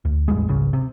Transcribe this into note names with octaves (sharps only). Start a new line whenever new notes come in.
D2
A1 E2 G3 G#3
G#1 C#2 C#3
C3